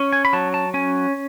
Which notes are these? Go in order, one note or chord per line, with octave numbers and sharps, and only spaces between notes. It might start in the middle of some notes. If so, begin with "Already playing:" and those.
Already playing: C#4
G#5
B5
F#3 A5
A5
C#4 G#5